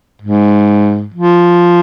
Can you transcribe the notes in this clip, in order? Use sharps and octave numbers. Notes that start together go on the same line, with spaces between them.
G#2
F3